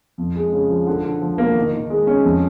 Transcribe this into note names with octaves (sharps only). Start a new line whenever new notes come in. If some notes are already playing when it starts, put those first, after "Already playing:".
F2
G#3
C#3
F3
D3
D3
F3
A#3
D#3
D#3
G#3
C#4
F2